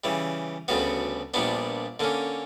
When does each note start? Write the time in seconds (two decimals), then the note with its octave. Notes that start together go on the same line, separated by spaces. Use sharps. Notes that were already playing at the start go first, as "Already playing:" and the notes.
0.04 C#3 E3 G3
0.68 D2 C#3 G3 B3 F#4
1.34 A#1 A#2 G3 B3 D4
2.00 D3 A#3 C#4